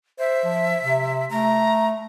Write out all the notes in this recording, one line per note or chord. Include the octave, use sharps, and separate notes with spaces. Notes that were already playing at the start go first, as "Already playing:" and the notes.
C5 E5
F3
C3
A3 A#5